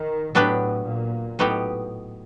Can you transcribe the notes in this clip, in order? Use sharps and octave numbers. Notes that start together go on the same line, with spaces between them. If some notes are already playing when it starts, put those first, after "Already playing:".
Already playing: D#3
A2 F#3 B3 D4 G4 B4
A#2
A2 F#3 B3 D#4 G4